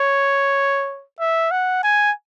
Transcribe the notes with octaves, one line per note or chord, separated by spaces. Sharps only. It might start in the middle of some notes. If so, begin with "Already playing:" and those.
Already playing: C#5
E5
F#5
G#5